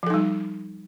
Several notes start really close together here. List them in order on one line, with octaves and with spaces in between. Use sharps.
F3 A4 D#4 G3